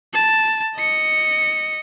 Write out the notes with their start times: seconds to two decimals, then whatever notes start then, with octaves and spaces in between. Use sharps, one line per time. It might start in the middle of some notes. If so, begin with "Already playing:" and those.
0.14 A5
0.76 D#5 C#7